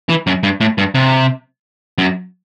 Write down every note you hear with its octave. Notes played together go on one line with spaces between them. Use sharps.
E3
F#2
G2
A2
G2
C3
F#2